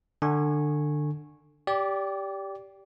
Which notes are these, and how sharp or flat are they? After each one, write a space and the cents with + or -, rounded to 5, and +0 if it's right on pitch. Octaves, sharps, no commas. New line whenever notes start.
D3 +20 G#5 +0 C#6 -15
G4 +0 D5 -25